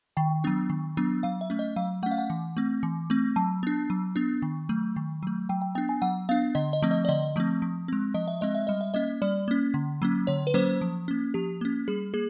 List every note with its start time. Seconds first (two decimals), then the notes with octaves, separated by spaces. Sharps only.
0.17 D#3 G5
0.44 F#3 B3 D4
0.70 D#3
0.97 F#3 B3 D4
1.23 F#3 F5
1.41 E5
1.50 A3 C#4
1.59 D#5
1.76 F#3 F5
2.03 A3 F#5
2.06 C#4
2.11 F5
2.18 F#5
2.30 E3
2.57 A3 C4
2.83 E3
3.10 A3 C4
3.36 F#3 A5
3.63 B3 D4
3.90 F#3
4.16 B3 D4
4.42 D#3
4.69 F#3 A3
4.96 D#3
5.23 F#3 A3
5.49 F#3 G5
5.62 G5
5.75 B3 D4 G5
5.89 G#5
6.02 F#3 F#5
6.29 B3 D4 F5
6.55 D3 D#5
6.73 D#5
6.82 F3 A3 C4
6.91 D#5
7.05 D5
7.09 D3 D#5
7.36 F3 A3 C4
7.62 F3
7.88 G#3 C4
8.14 F3 D#5
8.28 E5
8.41 G#3 C4 D#5
8.55 E5
8.67 G3 D#5
8.81 E5
8.94 A#3 C#4 D#5
9.22 G3 D5
9.48 A#3 C#4
9.74 D3
10.02 F#3 A#3 C#4
10.27 D3 C#5
10.47 B4
10.54 F#3 A#3 C#4 C5
10.81 F3
11.08 A#3 C#4
11.34 F3 G4
11.61 A#3 C#4
11.88 G3 G#4
12.14 A#3 G#4